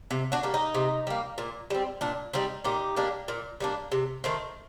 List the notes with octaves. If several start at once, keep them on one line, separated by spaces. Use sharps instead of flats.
C3
D4 F#4
G3 A#3
D#4
C3
G3 A#3
A#2
G3 C4
A#2 D4
G3 C4 D#4
A#2 D#4 G4
G3 A#3 D4
A#2
G3 A#3 D4
C3
D#3 A3 C4